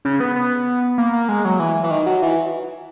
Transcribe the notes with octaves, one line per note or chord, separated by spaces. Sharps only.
C#3
B3
B3
A#3
A#3
G#3
F#3
E3
E3
D#3
F#3
E3